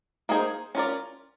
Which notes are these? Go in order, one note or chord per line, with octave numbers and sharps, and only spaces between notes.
A#3 D#4 G#4 C5
C#4 F4 A#4 D5